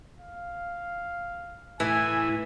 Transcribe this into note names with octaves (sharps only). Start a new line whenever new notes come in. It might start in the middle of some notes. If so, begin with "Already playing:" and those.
F5
A2 E3 E4 G#5